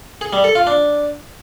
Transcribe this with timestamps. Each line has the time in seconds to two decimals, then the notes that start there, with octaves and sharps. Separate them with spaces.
0.21 G#4
0.33 G3
0.44 A4
0.55 F4
0.67 D4